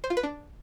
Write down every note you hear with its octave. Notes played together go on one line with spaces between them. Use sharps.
C5
F4
B4
D4